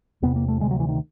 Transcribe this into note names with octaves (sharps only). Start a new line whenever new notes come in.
E2 C3 B3
A#3
A3
D2 C3 G#3
F#3
E3
D#3